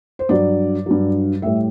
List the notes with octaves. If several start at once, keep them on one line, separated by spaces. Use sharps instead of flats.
C5
G2 F#3 D5
G2 F#3
A2 G3 E5